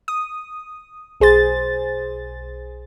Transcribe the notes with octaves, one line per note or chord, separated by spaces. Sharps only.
D#6
B1 G#4 C5 A6